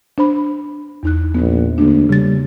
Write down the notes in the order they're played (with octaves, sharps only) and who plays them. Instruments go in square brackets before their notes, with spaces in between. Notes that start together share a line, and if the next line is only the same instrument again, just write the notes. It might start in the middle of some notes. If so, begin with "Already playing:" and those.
[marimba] D4 C5 B5
E2 D#4 F#6
[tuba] A#1 [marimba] B3
[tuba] D2 [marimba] A#3 D4
[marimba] C#3 A6 [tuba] G3